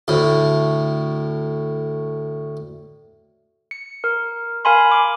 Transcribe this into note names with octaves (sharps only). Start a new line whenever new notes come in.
D2 A2
C#7
A#4
A#4 F5 G#5 B5 C6
D6 F6